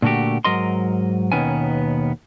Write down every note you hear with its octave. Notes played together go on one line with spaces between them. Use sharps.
A#2 D3 A3 F#4 G4
G#2 F#3 A#4 D#5 C6
D#2 B2 D#3 B3 C#4 G#5